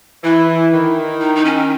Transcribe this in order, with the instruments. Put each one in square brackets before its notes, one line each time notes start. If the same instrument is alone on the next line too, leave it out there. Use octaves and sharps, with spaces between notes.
[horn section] E3 [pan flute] E4
[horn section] D#3
[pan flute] D#4
D#4
C#4